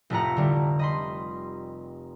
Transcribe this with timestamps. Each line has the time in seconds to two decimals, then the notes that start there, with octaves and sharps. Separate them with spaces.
0.10 F1 A2 A3 E4 F#5 A#5
0.37 D3 G3
0.79 D#5 B5 C6